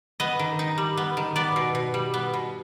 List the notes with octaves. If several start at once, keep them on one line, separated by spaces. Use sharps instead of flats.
B3 D#5
D#3
D#4
G3
B3
D#3
B3 D5
B2
B2
G3
B3
B2